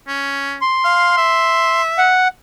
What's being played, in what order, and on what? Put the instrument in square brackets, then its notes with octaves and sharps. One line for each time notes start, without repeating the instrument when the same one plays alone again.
[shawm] C#4
[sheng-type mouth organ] C6
[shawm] F5
E5
[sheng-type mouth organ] F#5